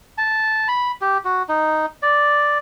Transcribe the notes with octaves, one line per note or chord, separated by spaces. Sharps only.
A5
B5
G4
F#4
D#4
D5